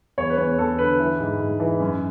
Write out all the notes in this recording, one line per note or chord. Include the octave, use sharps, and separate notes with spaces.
E2 C#5
B4
E2 C#5
E2 A4
D3 B4
E3
G#2
G#2
E3
F#2